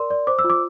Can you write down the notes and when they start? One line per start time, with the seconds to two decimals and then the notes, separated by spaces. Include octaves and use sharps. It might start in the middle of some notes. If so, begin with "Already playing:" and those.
Already playing: A#4 D5 C6
0.10 D5
0.27 C5 D6
0.39 E6
0.44 F4
0.50 D6